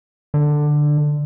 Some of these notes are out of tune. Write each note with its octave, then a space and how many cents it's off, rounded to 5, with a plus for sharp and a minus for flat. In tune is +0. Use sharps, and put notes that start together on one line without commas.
D3 +10